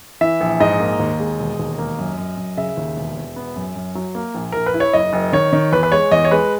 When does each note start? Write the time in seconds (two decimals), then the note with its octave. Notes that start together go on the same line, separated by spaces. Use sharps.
0.21 E3 E5
0.41 A#1
0.60 G#2 D#5
0.80 A#3
1.00 D#2
1.20 G#3
1.39 E1
1.59 D#2
1.79 A#3
1.99 F#2
2.18 F#2
2.37 F#2
2.57 C#3 E5
2.77 D#2
2.97 E1
3.16 E1
3.36 B3
3.56 F#2
3.76 F#2
3.95 F#3
4.15 A#3
4.35 A#1
4.52 A#1 A#4
4.66 B4
4.74 E4
4.80 C#5
4.93 F#1 D#5
5.13 F#1
5.33 D#3 C#5
5.53 D#3
5.72 E2 B4
5.83 B4
5.92 G#3 C#5
6.11 E2 D#5
6.25 C#5
6.31 G#3 B4